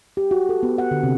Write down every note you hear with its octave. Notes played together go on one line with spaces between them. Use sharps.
G4
F#4
A4
B3
F#5
D3
C3